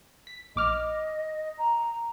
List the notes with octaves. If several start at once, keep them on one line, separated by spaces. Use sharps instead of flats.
B6
A#1 D#5 D6 F6
A#5